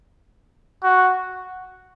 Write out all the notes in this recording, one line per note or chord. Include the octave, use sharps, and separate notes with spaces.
F#4